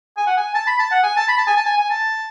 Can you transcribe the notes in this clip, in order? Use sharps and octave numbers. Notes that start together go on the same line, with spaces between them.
G#5
F#5
G#5
A5
B5
A5
F#5
G#5
A5
B5
A5
G#5
A5
G#5
G#5
A5